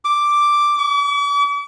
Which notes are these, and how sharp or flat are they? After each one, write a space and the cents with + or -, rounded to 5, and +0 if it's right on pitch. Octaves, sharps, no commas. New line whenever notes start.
D6 +0
D6 -45